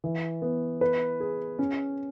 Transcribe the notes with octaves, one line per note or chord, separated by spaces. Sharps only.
E3
B3
B4
G#4
C#4